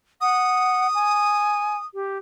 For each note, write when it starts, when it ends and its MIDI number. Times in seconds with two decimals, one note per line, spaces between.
0.21 0.87 78
0.21 1.86 87
0.94 1.77 80
1.94 2.18 67